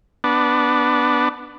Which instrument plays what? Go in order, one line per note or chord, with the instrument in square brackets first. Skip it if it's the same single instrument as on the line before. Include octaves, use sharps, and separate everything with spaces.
[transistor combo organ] B3 D4